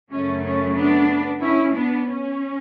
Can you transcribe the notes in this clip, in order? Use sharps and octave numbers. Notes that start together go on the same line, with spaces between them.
F#2 C#3 F#3 A3 C#4
C#4
B3 D4
C#4 E4
B3 D4
C#4